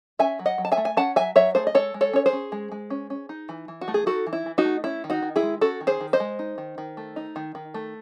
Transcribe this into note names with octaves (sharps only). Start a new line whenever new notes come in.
C#4 E5 G#5
F#3
D#5 F#5
F#3
A5
E5 G#5
A3
G#5
C#4 F#5 A5
F#3 E5 G#5
F#3 C#5 E5
A3 G#4 C5
D#5
G#3 A4 C#5
G#3
A4 C#5
C#4 C#5
G#4 C5
C#4
G#3
G#3
C#4
C#4
D#4
E3
E3
F#4
A3
G#4
D#4 F#4 A4
E3
E4
E3
D#4 F#4
A3
C#4 E4
D#3
D#4 F#4
D#3
E4 G#4
G#3
C#4 F#4 A4
D#3
G#4 C5
D#3
C5 D#5
G#3
D#4
D#3
D#3
A3
D#4
D#3
D#3
A3